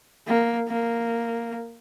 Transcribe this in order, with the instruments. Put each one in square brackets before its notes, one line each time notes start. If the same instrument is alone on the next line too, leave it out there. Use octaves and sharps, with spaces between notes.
[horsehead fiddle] A#3
A#3